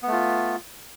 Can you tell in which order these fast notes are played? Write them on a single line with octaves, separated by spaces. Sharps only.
B3 A3 F4